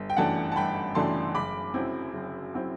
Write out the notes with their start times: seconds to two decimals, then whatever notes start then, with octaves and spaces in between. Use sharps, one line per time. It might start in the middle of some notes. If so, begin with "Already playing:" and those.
Already playing: G1
0.10 G5
0.17 F#2 E3 A3 D4 F#5 A5
0.52 A5
0.56 G1 G5 B5
0.95 F#2 E3 A3 D4 A5 C6
1.34 F#1 B5 D6
1.74 F#2 F#3 C4 E4
2.13 F#1
2.54 F#3 C4 E4